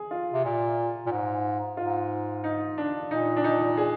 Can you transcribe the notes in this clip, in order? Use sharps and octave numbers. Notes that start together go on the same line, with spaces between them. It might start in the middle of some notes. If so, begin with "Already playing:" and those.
Already playing: G#4
F4
C3
A#2
A#2
G#2
G#2 F4
D#4
D4
A#2 D#4
D4
D#4
G#4